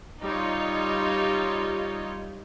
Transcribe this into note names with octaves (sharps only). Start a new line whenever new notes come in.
G3 D#4 F4 C#5